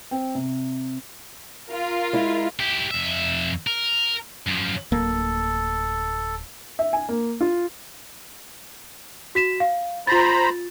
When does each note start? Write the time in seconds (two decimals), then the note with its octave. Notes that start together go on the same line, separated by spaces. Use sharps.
0.11 C4
0.35 C3
1.70 F4 A#4
2.13 G#3 E4
2.60 E4 G4
2.91 F2 E5
3.67 A#4
4.48 F#2 F3
4.92 D1 A#3 A4
6.79 E5
6.93 G#5
7.09 A#3
7.41 F4
9.35 F#4 B6 E7
9.60 F5
10.07 F4 C5 A#5 B5 A6